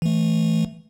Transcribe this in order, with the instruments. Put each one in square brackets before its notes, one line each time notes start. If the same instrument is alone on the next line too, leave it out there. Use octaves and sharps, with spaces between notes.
[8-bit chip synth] E3 A3